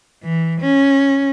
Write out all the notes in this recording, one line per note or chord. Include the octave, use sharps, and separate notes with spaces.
E3
C#4